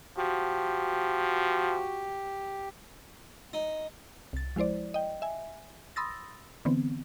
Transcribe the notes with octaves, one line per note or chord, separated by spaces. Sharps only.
F3 F#4 G4
D#4
C2 A6
F3 G#3 E4 C5 D5
D#5 G5
E5 G#5
B5 C6 D#6 E6 A6 A#6
D3 E3 B3 C4